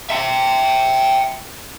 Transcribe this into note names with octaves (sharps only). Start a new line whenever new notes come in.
E5 G5